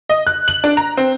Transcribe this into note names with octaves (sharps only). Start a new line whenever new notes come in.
D#5
F#6
F#7
D4
A#5
C4